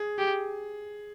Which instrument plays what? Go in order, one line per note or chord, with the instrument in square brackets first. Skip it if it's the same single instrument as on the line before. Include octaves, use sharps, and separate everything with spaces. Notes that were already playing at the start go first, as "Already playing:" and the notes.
Already playing: [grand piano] G#4
[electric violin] G4